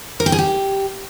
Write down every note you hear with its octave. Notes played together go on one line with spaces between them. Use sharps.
A#4
G5
G#4
G4